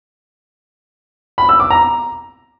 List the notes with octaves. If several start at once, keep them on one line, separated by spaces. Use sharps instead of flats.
B5
E6
D6
A#5